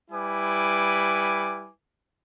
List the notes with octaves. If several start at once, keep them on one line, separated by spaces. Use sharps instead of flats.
G3 E4 B4 G#5 D6